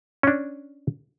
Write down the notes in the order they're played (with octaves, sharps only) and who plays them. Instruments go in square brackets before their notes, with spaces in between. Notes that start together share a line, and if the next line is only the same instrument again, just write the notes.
[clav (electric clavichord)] C#4 D4